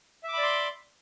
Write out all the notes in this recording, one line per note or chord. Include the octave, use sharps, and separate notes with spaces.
D5 E5 B5 C6 D6